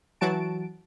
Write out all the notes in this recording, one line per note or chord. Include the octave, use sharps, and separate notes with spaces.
E3 F#3 F#4 A5 D7